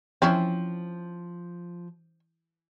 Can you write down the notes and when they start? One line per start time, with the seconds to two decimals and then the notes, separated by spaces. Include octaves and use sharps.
0.22 F3 C4 C#4 E4